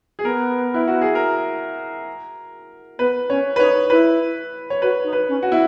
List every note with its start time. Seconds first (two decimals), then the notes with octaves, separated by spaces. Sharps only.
0.19 G#4
0.24 B3 A#4
0.74 E4
0.88 F#4
1.01 G#4
1.15 A#4
2.99 B3 B4
3.30 C#4 C#5
3.56 B4
3.59 D#4 C#5
3.90 E4 B4
4.70 C#5
4.82 F#4 B4
5.04 D#4
5.13 B4
5.28 C#4
5.43 F#4
5.50 B3 E4